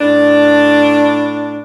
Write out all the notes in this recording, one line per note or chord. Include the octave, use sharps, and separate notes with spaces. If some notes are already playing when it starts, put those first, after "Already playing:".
A2 D4